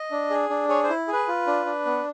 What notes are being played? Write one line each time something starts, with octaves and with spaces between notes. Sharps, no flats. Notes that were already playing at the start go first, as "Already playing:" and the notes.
Already playing: D#5
D4
G#4
D4
G#4 C#5
C5
E4
G#4
B4
F4
D4
D4
B3